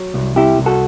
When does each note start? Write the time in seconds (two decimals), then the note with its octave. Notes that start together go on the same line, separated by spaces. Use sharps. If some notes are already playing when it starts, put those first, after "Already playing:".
Already playing: F#3
0.14 C2
0.36 C3 E4 G4
0.59 C2
0.66 F#4 A4